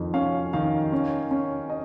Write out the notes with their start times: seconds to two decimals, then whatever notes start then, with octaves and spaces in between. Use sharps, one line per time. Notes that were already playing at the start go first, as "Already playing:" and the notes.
Already playing: F2 D#3
0.14 C#4 F5
0.53 D#3 F5
0.92 C#4
1.31 C#4
1.70 D#5